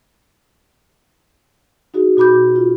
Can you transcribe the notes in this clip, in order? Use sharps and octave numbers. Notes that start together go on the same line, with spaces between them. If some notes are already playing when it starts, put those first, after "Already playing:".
D#4 F#4 G#4
B2 F#4 B5 D6 G6
F4